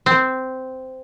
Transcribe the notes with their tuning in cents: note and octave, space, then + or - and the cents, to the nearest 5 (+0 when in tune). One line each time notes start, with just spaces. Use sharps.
C4 -10